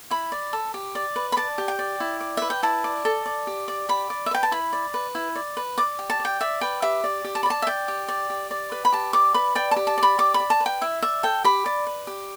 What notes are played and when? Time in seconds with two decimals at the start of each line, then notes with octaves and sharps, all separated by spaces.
0.10 E4 B5
0.32 D5
0.53 A4
0.74 G4
0.95 D5
1.16 B4
1.32 B5
1.37 D5 A5
1.58 G4
1.68 G5
1.79 D5
2.00 E4
2.20 D5
2.37 B4 E5
2.50 G5
2.63 E4 A5
2.84 D5
3.05 A4
3.26 D5
3.47 G4
3.68 D5
3.89 G4 B5
4.10 D5
4.26 E5
4.31 B4 G5
4.43 A5
4.51 E4 B5
4.73 D5
4.94 B4
5.15 E4
5.36 D5
5.57 B4
5.78 D5 D6
5.99 G4
6.10 A5
6.20 D5
6.25 G5
6.41 D5 E5
6.61 B4 G5
6.82 G4 E5
7.04 D5
7.24 G4
7.35 A5
7.43 B5
7.46 D5 A5
7.62 E5
7.67 D5 G5
7.88 G4
8.08 D5
8.30 G4
8.51 D5
8.72 B4
8.85 B5
8.92 G4 A5
9.13 D5 D6
9.34 B4 B5
9.55 D5 G5
9.71 A5
9.76 G4
9.87 A5
9.98 D5
10.03 B5
10.18 G4 D6
10.34 B5
10.40 D5
10.50 A5
10.60 B4
10.66 G5
10.81 E4 E5
11.02 D5 E5
11.23 A4 G5
11.44 G4 B5
11.66 D5
11.87 B4
12.07 G4